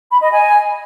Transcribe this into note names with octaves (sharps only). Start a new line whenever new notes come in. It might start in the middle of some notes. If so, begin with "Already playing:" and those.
B5
D#5
G#5